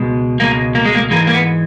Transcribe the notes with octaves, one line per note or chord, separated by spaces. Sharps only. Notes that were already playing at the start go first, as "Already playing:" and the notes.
Already playing: C#2 B2 G#3
C#2 B2 G#3 A#3
A#3
G#3
A#3
G#2 E3 G#3 A#3
A#3
B3